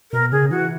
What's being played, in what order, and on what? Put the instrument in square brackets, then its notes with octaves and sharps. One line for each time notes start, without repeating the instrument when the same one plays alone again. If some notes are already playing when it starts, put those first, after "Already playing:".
[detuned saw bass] B2 [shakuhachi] A#4
[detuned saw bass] C#3 [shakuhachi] G#4
[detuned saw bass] E3 [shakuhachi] F#4